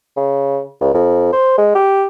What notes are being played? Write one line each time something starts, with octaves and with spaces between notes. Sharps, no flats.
C#3
C#2
F2
C5
G#3
G4